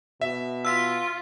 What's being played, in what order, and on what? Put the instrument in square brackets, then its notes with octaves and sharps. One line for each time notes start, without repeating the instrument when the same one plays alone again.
[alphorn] B2 [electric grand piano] E5
[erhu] F4 [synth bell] E6 B6